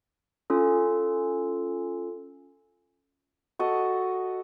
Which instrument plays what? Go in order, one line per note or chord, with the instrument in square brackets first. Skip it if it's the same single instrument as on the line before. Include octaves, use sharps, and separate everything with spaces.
[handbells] C#4 F4 A4
[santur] F#4 A4 D#5